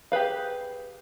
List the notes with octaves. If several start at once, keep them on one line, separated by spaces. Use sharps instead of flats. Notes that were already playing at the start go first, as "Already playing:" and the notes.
G4 G#4 B4 F5